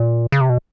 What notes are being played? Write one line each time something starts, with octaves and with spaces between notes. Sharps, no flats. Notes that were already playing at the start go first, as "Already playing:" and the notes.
Already playing: A#2
C#3
C3
B2